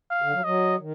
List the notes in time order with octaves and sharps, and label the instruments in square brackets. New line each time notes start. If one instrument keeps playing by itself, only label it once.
[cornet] F5
[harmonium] D3
F#3
[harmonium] F#3 [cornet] D#5
[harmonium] D#3